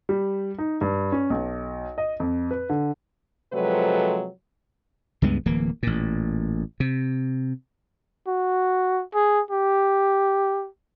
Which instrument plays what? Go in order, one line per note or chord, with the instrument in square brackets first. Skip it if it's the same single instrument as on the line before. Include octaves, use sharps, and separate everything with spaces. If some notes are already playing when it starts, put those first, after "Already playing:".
[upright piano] G3
D#4
G2
C#4
B1
D#5
F2
B4
D3
[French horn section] C3 F3 F#3 G#3 A4 B4
[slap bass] C#2 G2 G#3 B3
D1 E3 A#3
A1 A#2
C3
[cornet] F#4
G#4
G4